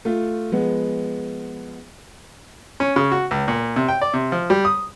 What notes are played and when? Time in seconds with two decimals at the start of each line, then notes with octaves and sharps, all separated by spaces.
0.05 A3 F4
0.52 F3 G#3 B3
2.80 C#4
2.96 C#3
3.12 F#4
3.31 C#2
3.48 A#2
3.76 C3
3.88 G5
4.02 D5
4.14 C3
4.32 F3
4.50 G3
4.65 D#6